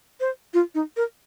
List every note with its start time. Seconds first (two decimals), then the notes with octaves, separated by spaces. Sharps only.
0.20 C5
0.54 F4
0.75 D#4
0.97 A#4